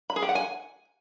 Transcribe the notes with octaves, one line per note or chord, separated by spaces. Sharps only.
B5
G#4
G4
F#5
G#5